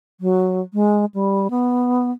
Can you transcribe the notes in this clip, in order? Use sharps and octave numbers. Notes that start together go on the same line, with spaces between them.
F#3
G#3
G3
B3